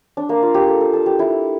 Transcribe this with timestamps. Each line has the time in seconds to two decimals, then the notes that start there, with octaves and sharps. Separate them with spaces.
0.17 D4
0.29 A#3
0.43 F4
0.54 G4
0.68 A4
0.81 A4
0.93 A4
1.06 G4
1.19 E4